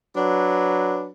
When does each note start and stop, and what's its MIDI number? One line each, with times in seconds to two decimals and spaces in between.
0.16 1.08 54
0.16 1.08 62
0.16 1.08 71